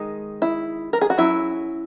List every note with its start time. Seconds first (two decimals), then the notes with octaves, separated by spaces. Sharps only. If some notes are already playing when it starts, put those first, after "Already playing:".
Already playing: D#3 G#3 D#4
0.42 E4
0.93 A#4
1.01 G#4
1.10 F#4
1.18 F#3 C#4 E4